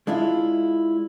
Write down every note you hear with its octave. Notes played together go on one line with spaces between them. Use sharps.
G#3 D4 E4 F4